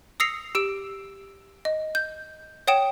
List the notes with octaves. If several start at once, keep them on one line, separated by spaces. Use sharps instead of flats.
D#6 E6 A#6 C7 C#7 F7
G4 E6 D7
D#5
G6
C#5 F#5 G5 D#6 D7 E7